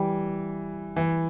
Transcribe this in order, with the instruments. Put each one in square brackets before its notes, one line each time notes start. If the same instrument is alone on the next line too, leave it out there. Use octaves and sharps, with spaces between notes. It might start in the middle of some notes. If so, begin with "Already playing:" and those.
Already playing: [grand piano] E3 [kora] G3
[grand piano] E3